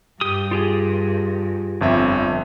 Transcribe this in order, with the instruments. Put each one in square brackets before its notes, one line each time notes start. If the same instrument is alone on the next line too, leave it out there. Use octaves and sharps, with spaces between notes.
[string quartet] G2 [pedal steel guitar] G4 D#6
[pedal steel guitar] F4 G4 G#4
[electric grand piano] G1 F2 E5